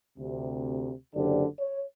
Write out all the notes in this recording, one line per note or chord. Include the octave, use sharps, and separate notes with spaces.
D2 C3
F#1 D3 G4 C5 D5
C#5